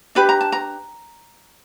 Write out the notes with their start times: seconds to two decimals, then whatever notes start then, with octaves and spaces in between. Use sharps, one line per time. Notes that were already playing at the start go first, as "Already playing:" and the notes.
0.15 D4 G4 B4 B5
0.29 A#5
0.41 A5
0.52 A#5